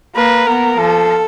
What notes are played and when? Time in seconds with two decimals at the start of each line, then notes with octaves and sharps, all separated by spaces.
0.16 A#3 B4
0.47 B3 A#4
0.78 F3 A4